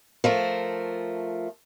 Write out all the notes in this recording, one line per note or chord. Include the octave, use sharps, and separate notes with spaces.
F3 A3 A#4